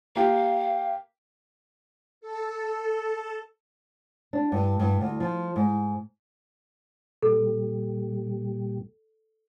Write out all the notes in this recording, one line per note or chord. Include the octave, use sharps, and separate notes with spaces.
A#3 G4 F5
A4
D4
G2
G2
D2
F3
G#2
A#2 G3 A4